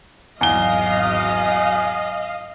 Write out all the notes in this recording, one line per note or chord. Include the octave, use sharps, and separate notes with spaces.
G#1 E2 B2 F#3 D#5 F5 G7